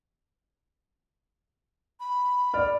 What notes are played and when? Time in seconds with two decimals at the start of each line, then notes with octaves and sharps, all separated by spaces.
2.00 B5
2.54 D5 F6